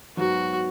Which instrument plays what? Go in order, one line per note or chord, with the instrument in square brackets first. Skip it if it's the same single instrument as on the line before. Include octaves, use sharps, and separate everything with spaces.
[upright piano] G#2 F#3 B3 [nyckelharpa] F#4